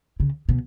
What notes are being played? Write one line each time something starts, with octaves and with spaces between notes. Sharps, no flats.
C#3
B2